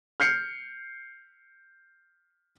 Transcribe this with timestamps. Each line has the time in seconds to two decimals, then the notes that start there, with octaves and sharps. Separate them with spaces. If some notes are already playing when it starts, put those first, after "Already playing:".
0.20 F6 G6 C7 C#7